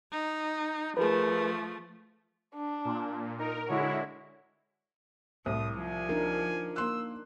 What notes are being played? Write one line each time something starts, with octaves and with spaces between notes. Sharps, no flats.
D#4
F3 A3 G#4 A#4 B4
D4
A#2
D#4 A#4
D3 G#3 E4 F#4 C#5
C2 A2 D#6
F3 G#5
D4 D#4 A#4
A#3 C6 E6 F#6